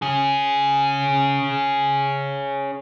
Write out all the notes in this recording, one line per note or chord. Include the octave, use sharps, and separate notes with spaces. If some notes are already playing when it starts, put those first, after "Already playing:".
C#4 G#4